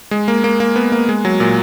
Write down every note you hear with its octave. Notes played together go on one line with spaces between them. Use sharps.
G#3
A#3
A#3
A#3
B3
A#3
G#3
F#3
A#2